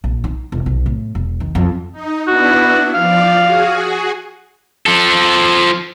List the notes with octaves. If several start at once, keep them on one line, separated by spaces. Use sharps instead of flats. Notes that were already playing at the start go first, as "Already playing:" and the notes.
A#1
D#4
E1
B1
A2
E1
D#3
F2
D#4
B3 D4 E4 F#4
F3 D5 F5
F#4 G#4
F3 A4